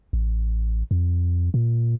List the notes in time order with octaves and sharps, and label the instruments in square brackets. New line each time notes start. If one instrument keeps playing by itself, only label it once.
[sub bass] A1
F2
A#2